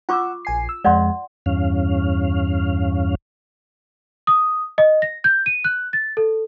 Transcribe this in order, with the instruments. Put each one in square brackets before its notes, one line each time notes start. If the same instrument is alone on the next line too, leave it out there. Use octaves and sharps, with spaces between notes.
[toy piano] F4 C#6 D6 [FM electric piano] F#5 E6
[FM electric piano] A#1 G#5 C7
E6
[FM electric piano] F2 G#3 [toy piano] D5 F#5 C6
[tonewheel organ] E2 G2 C#4 F5
[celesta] D#6
D#5
A#6
G6
D#7
F#6
A6
A4